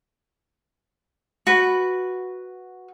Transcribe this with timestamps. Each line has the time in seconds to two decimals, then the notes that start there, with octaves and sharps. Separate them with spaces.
1.47 F#4 B4